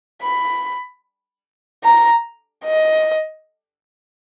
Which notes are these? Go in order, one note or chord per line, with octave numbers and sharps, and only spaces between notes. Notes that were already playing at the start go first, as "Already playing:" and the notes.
B5
A#5
D#5